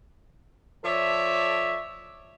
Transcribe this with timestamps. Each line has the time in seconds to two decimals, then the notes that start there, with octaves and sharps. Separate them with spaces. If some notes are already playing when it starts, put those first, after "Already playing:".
0.84 F3 A4 C#5 D5 E5